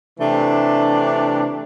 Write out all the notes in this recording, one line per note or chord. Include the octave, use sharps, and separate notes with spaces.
C3 E3 A3 D4